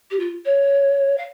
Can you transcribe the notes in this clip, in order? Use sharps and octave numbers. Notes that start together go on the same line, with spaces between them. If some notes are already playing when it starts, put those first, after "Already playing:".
G4
F4
C#5
F5